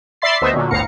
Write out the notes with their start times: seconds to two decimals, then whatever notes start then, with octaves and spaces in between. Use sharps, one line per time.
0.22 D5 E5 B5 C6 A6 C7
0.41 D2 A3 B3 C5 D#5 E5
0.53 A#2 D3 F#3
0.71 G1 D2 A2 F5 A#5 C#7